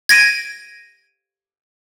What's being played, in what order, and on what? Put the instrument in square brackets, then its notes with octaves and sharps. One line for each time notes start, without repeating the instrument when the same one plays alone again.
[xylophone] G#6 A#6 D7 D#7